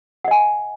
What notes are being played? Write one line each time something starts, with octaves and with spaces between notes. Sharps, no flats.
D#5 F#5 G#5